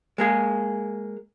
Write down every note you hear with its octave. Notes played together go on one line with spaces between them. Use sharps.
G#3 A#3 G#4